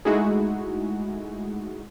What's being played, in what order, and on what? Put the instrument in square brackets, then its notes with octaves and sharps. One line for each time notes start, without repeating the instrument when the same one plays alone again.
[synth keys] G#3 A3 D#4 E4 F#4 G#4